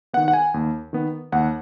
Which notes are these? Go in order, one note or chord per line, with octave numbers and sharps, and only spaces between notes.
D#3 B3 F#5
F#5
G#5
D#2
D#3 B3
D#2 F#5